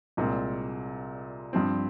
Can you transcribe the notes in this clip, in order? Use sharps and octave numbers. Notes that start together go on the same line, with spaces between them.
C2 A#2 G#3 C4
G2 F3 C4